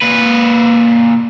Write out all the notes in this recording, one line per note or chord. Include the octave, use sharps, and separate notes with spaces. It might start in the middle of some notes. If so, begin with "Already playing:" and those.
A#2 B4